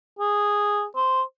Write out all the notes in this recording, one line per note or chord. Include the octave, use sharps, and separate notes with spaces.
G#4
C5